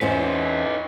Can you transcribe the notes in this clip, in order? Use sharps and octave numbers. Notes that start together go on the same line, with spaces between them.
E2 C#4 D#4 B4 C5